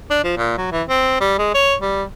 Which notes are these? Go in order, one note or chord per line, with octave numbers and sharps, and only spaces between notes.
D4
F3
A#2
F#3
E3
C4
G3
G#3
C#5
G3